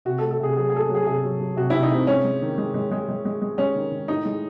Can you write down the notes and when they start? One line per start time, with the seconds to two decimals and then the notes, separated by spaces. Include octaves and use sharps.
0.05 C3 F#4
0.18 A4
0.23 A3
0.31 A4
0.40 C3 G#4
0.56 F#3 G#4
0.69 G#4
0.72 A3 A4
0.81 G#4
0.89 F#3
0.95 G#4
1.06 C3 G#4
1.23 F#3
1.40 F#3
1.56 C3 F#4
1.70 C3 E4
1.83 D#4
1.91 C3 C4
2.07 G#3 C#4
2.24 G#3
2.42 D#3
2.58 G#3
2.74 G#3
2.91 G#3
3.09 G#3
3.25 G#3
3.42 G#3
3.58 G#3 C#4
3.75 D#3
3.91 D#3
4.08 A2 D#4
4.25 G#3